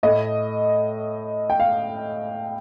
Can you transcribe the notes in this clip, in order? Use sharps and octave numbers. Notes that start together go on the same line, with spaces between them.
A2 A3 D#5
G5
F5